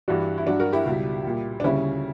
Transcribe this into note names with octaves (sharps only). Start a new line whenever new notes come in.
G2 E3 G3 D4 F#4
E4
G2 F#3 D4 F#4
F#4 A#4
E4 G4
C#2 B2 G3
A#2 G3
D4
D2 C#3 G3 C#4 E4